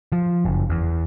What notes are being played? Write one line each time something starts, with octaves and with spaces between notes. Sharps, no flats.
F3
F#1
E2